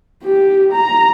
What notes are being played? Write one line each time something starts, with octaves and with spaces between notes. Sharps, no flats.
G4
A#5